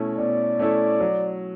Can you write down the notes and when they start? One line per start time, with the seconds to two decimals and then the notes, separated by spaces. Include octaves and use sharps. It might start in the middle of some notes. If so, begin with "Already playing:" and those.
Already playing: B2 A3 C#4 E4 A4
0.18 B2 D5
0.59 A3 C#4 E4 A4
1.00 F#3